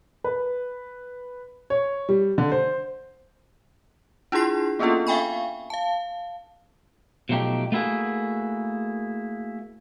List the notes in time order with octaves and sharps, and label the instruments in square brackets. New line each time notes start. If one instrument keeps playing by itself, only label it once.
[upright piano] B4
C#5
G3
D3
C5
[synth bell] D4 E4 F4 G#4 C6 C7
A#3 B3 C#4 D4 F4 A4
E5 F5 G5 G#5 B5 C#6
F5 A5
[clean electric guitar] B2 F3 F#3 A3 D#4 G4
A3 A#3 E4 F#4 G#4